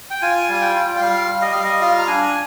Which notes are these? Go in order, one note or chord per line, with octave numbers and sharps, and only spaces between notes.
G5
F4 G#5
G3 G#5
G5
F4
G5
G3 F5
G3
D#5
G3 F5
D#5
F4 F5
A#5
D4 G#5